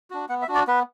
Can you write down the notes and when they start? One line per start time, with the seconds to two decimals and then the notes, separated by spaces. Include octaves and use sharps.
0.10 D4 F#4
0.29 B3 F#5
0.42 E5
0.48 D4 F#4
0.55 D5
0.67 B3 B4